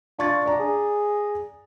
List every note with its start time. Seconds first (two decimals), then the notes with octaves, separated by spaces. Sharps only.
0.19 D4 F4 C#6 A6
0.46 D5 A#5
0.60 G#4